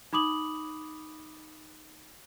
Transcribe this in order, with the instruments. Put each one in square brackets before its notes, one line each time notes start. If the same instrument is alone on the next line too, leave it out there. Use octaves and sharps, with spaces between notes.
[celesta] D#4 B5 D6 D#6 F#7